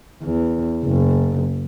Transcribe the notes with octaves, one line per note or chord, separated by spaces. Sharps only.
E2
F#1